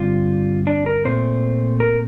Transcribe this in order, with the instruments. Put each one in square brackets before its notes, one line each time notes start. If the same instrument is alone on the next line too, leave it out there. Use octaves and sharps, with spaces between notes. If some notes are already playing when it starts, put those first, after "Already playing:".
Already playing: [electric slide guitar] G2 D3 G3 C4 F4
D4
A#4
A#2 A3 C4 C5
A#4